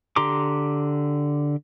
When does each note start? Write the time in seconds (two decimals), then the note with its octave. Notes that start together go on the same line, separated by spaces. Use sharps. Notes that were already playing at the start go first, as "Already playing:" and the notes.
0.16 D3 G4 A#5 C6 D6